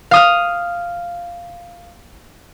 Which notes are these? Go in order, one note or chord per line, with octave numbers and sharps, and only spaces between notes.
F5 D#6 F6